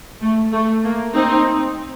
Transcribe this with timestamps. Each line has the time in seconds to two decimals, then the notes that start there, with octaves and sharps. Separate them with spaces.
0.22 A3
0.53 A3
0.84 A#3
1.15 C4 D#4